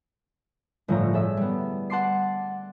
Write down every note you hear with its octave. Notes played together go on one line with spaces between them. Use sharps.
G1 A2 F3 A3 C#5 A#5
G#4 A4 E5
G3 B3
F#5 A5 C6 D6 C7